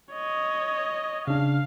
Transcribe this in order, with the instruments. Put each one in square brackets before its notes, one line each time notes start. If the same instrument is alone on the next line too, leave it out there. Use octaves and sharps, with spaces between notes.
[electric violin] C#5 D#5
[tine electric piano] C#3 D4 [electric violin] F5